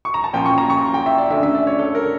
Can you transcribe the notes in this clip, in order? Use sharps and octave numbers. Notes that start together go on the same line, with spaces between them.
C#6
A#5
A5
A#2 F3 C#4 G5
C#6
A#5
C#6
G5
E5
D5
D3 A3 C#4 E5
E5
D5
C#5
A4
A#4